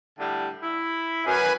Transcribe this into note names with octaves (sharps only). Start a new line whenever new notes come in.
A2 D3 G3
E4
F#2 B4 G#5